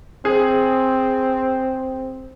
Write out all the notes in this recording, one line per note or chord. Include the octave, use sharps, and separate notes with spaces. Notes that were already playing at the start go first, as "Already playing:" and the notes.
C4 G#4